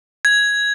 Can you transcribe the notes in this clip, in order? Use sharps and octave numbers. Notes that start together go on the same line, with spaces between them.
G#6